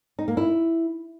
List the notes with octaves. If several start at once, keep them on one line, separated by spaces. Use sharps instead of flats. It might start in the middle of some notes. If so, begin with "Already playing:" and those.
D#4
A#3
E4